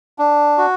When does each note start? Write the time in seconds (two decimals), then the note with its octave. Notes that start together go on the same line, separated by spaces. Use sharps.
0.19 D4
0.58 F#4